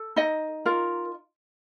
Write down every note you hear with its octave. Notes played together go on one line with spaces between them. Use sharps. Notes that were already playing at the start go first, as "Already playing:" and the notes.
Already playing: A4
D#4 D#5
F4 A#4